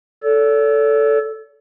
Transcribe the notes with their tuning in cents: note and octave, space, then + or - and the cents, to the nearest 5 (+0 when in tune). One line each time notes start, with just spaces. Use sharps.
A4 +0 D5 -45